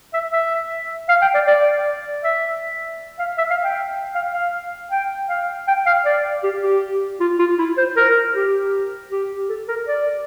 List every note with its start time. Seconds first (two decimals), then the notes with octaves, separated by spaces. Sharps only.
0.14 E5
0.32 E5
1.09 F5
1.22 G5
1.34 D5
1.47 D5
2.24 E5
3.19 F5
3.38 E5
3.50 F5
3.63 G5
4.15 F5
4.33 F5
4.91 G5
5.29 F5
5.67 G5
5.86 F5
6.05 D5
6.43 G4
6.63 G4
7.20 F4
7.39 F4
7.58 E4
7.77 C5
7.96 A#4
8.35 G4
9.11 G4
9.49 A4
9.68 A#4
9.88 D5